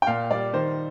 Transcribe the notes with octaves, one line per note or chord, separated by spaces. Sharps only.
G5
A#2 F5
G3 D5
D#3 C5